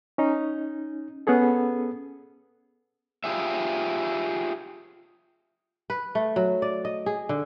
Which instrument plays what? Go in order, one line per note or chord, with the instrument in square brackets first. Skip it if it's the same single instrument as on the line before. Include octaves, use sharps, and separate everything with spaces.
[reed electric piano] C#4 D#4
B3 C#4 G#4 A4
[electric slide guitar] F4 G4 G#4 E5
[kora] B4
A3
F#3
D5
D#5
G#4
D3